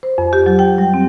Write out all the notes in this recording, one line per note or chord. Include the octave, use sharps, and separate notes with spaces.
C5
F2
G4
F#3
G5
G3
C4